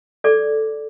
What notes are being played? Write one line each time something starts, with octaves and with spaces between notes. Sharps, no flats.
A4 D5 D6